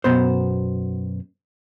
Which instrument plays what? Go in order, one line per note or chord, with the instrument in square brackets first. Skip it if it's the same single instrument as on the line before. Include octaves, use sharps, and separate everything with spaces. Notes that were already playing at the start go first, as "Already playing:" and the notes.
[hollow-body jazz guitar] F#2 B2 B3 C5